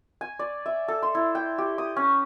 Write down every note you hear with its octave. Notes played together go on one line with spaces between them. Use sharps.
G#5
D5
E5
A4
C6
E4
G5
G4
D#6
C#4